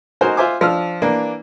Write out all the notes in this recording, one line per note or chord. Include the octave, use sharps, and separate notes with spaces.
D#4 F#4 A#4 C5 G#5
F4 C5 E5 G#5 D6
F3 D4 F4 E6 F6
E3 A#3 D4